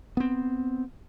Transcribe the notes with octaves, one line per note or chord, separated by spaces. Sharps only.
B3 C4